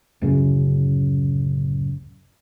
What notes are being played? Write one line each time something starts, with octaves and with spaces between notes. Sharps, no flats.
D1 F#2 C#3